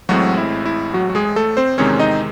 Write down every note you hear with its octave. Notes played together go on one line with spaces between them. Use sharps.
A1 A2 F#3 G#3 C4 F#4
E4
E4
F#3 F#4
F#4
G#3 G#4
A3 A4
C4 C5
E2 C3 D#3 G#3 C4 C#4 C#5
D#4 D#5